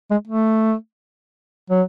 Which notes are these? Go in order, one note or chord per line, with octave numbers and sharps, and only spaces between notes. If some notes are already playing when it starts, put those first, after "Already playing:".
G#3
A3
F#3